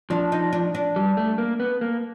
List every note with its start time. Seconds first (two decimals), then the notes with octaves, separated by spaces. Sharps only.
0.10 F3 D4
0.32 D#4
0.53 D4
0.75 D4
0.96 G3
1.17 A3
1.38 A#3
1.60 B3
1.81 A#3